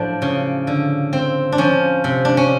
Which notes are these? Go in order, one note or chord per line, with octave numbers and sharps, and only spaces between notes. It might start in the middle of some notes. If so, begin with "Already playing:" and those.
Already playing: A2 F3 F#3 D4
C#3
D3
C4
D4
F3 C#4
C3
D4
C#4